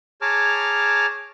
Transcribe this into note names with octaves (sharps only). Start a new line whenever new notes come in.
G#4 C#5 A5 A#5 D6 F6